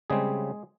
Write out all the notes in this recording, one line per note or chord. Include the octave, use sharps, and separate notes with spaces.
C#3 G3 G#3 C4 G#4